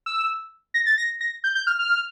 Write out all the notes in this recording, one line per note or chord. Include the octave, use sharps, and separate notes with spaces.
E6
A#6
A6
A#6
A#6
G6
G6
F6
F6